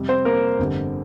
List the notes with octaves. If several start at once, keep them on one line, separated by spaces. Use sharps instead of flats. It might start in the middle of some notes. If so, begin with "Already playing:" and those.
Already playing: F2 C3 G3
C4 C5
A#3 A#4
G1 F2 D3 G3